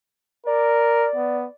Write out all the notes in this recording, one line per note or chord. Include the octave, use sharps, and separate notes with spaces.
A#4 D5
B3